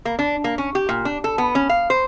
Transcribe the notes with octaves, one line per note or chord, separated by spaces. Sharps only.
A#3
D4
A#3
C#4
G4
A#2
D4
A4
B3
C#4
F5
C5